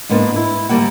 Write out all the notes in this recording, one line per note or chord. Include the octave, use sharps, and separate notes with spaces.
G#2 A#3 B3 D4 F4
E4
D2 F#3 G3 A#3 F#5